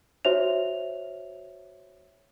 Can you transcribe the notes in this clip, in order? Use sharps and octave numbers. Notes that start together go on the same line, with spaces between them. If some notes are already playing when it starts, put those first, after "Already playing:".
F#4 C5 C#5 E5 F7